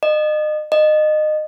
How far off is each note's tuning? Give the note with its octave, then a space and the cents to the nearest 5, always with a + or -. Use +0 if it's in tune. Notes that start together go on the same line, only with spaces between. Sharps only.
D#5 -35
D#5 -25